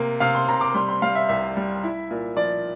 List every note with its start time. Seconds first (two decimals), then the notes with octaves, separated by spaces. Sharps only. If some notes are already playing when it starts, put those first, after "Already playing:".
Already playing: C3 A#3
0.20 C3 F5
0.35 C6
0.48 C3 A#5
0.61 D6
0.74 G3 C6
0.89 C6
1.02 G3 F5
1.15 E5
1.29 C2 E5
1.57 G3
1.84 E4
2.11 A#2
2.37 F3 D5